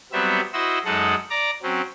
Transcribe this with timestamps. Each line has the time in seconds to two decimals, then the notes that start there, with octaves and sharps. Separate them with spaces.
0.12 F#3 G3 B3 C4 E5
0.53 E4 F#4 C5 D#5 E6
0.85 F#2 G#3 D#4 A4 F#5
1.30 D5 A#5 D6
1.62 F#3 C4 C#4